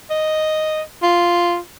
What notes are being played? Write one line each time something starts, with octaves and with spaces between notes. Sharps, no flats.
D#5
F4